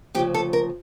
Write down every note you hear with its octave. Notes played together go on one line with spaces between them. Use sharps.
D2 C#3 F3 G4
A4
A#4